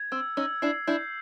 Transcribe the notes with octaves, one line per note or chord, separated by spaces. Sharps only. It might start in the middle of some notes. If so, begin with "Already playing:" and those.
Already playing: G#6
C4 E6
C#4 D#4 E6
D4 E4 C7
D4 E4 G6